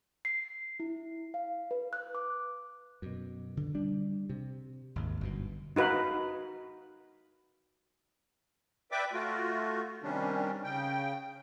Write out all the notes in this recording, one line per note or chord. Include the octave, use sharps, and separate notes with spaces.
C7
E4
F5
B4
F#6
D6
F#2 B2
D3
G3 D4
C3
G#1 D#2
G1 F#2 B2
D#4 F#4 B4 F5
B4 D5 E5 G5 D6
A3 F4 F#4
C3 D#3 G3 C#4 D4
C#3 G5